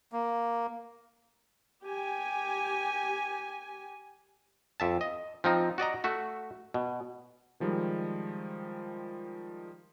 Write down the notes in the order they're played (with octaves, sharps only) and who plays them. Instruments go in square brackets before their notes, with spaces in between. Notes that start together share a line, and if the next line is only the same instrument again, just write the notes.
[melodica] A#3
[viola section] G4 G#5
[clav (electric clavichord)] F2 E5 A5
D#5
F3 C4 D#4
F#4 D5 D#5 A#5
A3 F#4 E5
B2
[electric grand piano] D#3 F3 G3 G#3